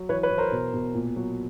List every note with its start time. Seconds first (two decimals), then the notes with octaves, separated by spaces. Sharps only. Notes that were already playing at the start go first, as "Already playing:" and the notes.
Already playing: F#3
0.09 E3 B4 C#5
0.23 B4 C#5
0.31 E3
0.38 A#4 C5
0.52 B2
0.73 B2
0.95 A#2
1.16 F#3